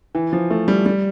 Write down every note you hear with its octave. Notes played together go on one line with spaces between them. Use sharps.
E3
F3
A3
G3
G3